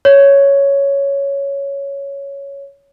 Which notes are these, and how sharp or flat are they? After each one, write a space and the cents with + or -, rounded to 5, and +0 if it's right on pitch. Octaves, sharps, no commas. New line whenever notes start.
C#5 +5